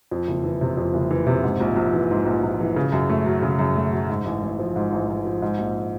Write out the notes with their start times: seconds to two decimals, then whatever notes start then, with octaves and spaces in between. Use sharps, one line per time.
0.11 F2
0.28 F#1
0.43 E3
0.61 C3
0.77 F2
0.94 F#1
1.11 E3
1.27 C3
1.44 G#2
1.60 A#1
1.76 A#1
1.93 E3
2.11 G#2
2.26 A#1
2.43 A#1
2.60 E3
2.76 C#3
2.92 F#2
3.10 A3
3.26 F#3
3.42 C#3
3.59 F#2
3.76 A3
3.92 F#3
4.09 G#2
4.25 A1
4.43 A1
4.59 F3
4.76 G#2
4.93 A1
5.09 A1
5.25 F3
5.42 G#2
5.59 A#1